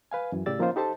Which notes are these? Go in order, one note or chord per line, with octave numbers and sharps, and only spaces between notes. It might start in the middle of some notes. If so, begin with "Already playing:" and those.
B4 F5 G#5
F#2 E3
A2 C#3 G4 D5 E6 A6
F3 A#3 C#4 D#4 F4 C5
D#4 G4 A4 C5 A5